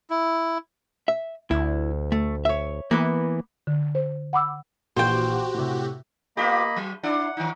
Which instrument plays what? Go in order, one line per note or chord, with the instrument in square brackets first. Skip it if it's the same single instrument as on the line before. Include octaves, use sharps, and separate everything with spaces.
[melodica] E4
[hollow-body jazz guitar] E5
[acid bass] D2 [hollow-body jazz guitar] E4
[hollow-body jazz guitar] A3
C#5 E5
[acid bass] E3 [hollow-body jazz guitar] A#3 B3 B4
[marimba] D3
C5
F#5 B5 D6 E6
[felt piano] A#1 A#2 E3 [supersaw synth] F#4 G4 [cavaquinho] C5 G5
[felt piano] A2 C3
[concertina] A#3 D#5 B5 [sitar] B3 F4 G4
[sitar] F#3
[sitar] D4 E4 D5 [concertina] F#5
[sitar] D#3 D#4